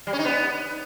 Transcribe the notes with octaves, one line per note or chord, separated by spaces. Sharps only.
G3
C#4
D#4
B3